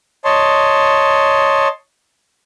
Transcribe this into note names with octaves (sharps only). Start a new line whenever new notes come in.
C#5 D#5 A5 C6